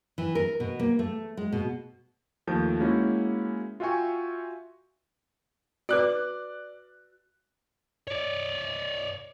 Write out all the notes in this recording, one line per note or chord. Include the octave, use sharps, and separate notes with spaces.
E3
A#4
B2
A#3
A3
G#3
B2
D#2 F3 A3 G6
G#3 A#3 C#4 E4 F#4
F4 F#4 E5 G5 G#5 C#6
F#4 B4 D5 F#6
C#5 D5